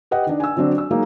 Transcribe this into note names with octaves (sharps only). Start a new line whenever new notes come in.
G4 B4 D#5 F#5 G5
D#3 D4
G#5 E6
D3 F#3 C4 D4
E6
F#3 G#3 A#3 D#4